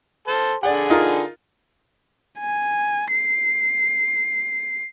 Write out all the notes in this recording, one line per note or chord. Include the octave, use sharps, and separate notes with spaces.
A4 C5 A5
D3 G#4 D5 F#5
D#4 F4 A#4
G#5
C7